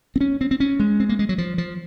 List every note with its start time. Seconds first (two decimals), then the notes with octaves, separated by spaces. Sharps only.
0.16 C4
0.21 C#4
0.41 C4
0.51 C4
0.60 C#4
0.80 G#3
1.00 C4
1.09 A#3
1.19 G#3
1.29 F#3
1.38 F3
1.58 F3